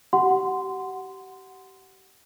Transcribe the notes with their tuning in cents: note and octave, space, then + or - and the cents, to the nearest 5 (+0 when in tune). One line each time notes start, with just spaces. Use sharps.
G4 -30 F#5 +0 C6 -15